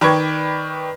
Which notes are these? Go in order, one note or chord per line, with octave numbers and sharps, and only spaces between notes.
D#3 B4 D5 G5 C#6 G#6